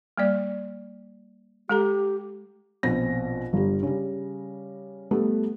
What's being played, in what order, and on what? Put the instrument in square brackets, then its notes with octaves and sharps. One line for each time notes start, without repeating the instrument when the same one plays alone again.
[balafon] G3 A#3 D5
[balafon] G#3 A4 A#5 [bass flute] G4
[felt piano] A#1 B2 C4 A#6
G1 G3
C#3 G3
G3 A3 B3